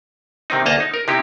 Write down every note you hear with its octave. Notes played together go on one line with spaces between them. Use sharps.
C3 D#3 C4 D#4
D2 A#3 D#5 A5 A#5
D#4
A#4
C3 D#4 E4 G4